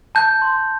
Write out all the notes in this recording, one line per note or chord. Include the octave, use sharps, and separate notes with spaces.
A5 G6
C6